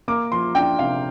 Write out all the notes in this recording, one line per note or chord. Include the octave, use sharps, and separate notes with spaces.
A#3 D6
F3 C6
D4 G5
C3 F5